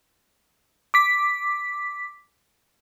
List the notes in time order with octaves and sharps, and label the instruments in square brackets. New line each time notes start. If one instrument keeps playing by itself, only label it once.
[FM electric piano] D6 B6